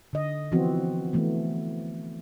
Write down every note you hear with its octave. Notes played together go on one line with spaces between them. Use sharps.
D3 D#5
E3 F3 B3 C4 F#4
E3 A3 B3